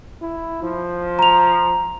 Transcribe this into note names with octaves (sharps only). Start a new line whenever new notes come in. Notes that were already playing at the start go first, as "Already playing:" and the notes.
E4
F3
A#5 F7